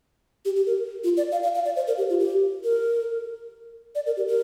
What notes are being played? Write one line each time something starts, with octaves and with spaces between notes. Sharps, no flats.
G4
G4
A#4
F4
D5
F5
F5
F5
D5
C5
A#4
G4
F4
G4
A#4
D5
A#4
G4
A#4